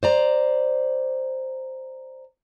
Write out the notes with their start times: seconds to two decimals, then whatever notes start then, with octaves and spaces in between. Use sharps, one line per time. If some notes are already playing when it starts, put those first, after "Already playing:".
0.03 C5 D5 A#5